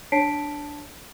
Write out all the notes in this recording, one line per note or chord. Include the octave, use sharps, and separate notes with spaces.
D4 C#5 A5 B6 C7 D7